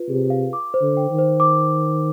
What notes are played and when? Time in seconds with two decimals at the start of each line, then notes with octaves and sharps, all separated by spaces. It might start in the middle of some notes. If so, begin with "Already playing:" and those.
Already playing: F4 B4
0.09 C3 G#4
0.30 F5
0.53 D6
0.74 C5
0.81 D3
0.97 G5
1.11 D#3
1.19 C5
1.40 D6